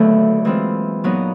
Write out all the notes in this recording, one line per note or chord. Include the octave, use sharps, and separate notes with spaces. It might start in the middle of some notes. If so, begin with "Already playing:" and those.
Already playing: D#2 D3 F#3 A3 B3
E3 G#3 C4 F4
A#2 F#3 B3 D#4